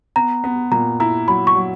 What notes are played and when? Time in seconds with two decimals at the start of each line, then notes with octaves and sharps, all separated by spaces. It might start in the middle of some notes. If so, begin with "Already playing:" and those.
0.16 B3 A#5
0.44 B3
0.71 A#2 A#5
1.00 E4 A#5
1.28 F#3 B5
1.47 C#6
1.56 F#3